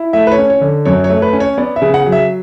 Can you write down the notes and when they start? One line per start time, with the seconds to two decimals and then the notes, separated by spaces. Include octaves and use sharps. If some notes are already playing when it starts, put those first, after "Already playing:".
Already playing: E4
0.13 A3 E5
0.27 B4
0.32 C#5
0.38 C#4
0.50 C#5
0.61 D3
0.85 F#2 C#5
1.04 C#5
1.09 A3
1.22 B4
1.33 C#4
1.40 C#5
1.58 B3 D5
1.76 E5
1.82 C#3
1.94 F#5
2.06 F#3
2.12 E5